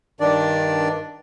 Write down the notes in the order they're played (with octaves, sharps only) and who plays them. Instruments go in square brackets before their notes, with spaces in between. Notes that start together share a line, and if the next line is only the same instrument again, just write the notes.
[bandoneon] G2 D#3 D4 D5